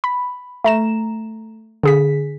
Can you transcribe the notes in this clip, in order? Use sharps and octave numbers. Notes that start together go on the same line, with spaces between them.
B5
A3 A#5 E7
D3 G#4 B6